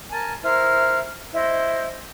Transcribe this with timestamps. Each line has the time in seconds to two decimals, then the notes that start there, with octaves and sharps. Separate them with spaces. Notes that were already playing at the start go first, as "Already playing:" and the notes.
0.10 A#4 G#5 A5
0.42 E4 A#4 C5 F6
1.32 E4 C5 D#5